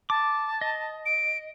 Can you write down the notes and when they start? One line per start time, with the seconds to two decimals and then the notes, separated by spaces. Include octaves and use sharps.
0.10 A5 D6
0.61 D#5
1.06 D7